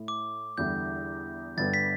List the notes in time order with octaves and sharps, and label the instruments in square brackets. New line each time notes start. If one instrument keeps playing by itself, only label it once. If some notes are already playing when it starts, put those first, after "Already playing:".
Already playing: [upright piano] A2 A3 E4
[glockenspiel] D6
[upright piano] E2 D3 G3 E4 [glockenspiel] G6
[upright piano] G1 G2 D3 G3 B3 [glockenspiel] A6
[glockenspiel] B6